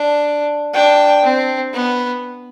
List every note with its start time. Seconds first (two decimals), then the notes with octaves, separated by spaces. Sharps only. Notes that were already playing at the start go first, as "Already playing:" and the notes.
Already playing: D4
0.74 D4 G5
1.23 C4
1.73 B3